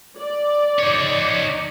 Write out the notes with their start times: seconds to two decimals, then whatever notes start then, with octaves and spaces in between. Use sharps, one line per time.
0.18 D5
0.79 D#4 C#5